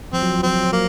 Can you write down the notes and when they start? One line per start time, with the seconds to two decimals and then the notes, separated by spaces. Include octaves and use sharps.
0.13 F3 C4
0.22 F#3
0.30 F3
0.39 F#3
0.43 F3 C4
0.56 F#3
0.64 F3
0.72 F#3 A#3